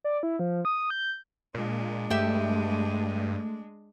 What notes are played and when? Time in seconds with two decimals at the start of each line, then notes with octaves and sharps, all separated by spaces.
0.04 D5
0.23 E4
0.39 F3
0.65 D#6
0.90 G6
1.54 A#2 G#3 D4
2.10 G2 A3 G4 E5